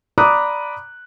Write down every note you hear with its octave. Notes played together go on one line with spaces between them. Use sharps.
D5 A#5 B5 D6 D#6 F#6